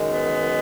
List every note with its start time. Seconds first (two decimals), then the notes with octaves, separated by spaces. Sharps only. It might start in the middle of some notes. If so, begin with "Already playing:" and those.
Already playing: F#2 D#3 G#3
0.10 B3